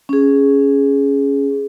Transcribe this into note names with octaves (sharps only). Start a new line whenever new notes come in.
C#4 G#4